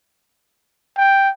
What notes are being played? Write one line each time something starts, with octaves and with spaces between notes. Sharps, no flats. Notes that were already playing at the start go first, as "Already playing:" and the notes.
G5